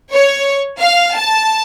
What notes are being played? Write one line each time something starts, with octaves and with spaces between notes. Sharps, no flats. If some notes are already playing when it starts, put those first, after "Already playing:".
C#5
F5
A5